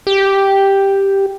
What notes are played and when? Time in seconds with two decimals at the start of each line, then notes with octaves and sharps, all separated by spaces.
0.07 G4